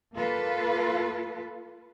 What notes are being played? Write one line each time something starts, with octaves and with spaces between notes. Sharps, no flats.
A#3 F4 A4 B4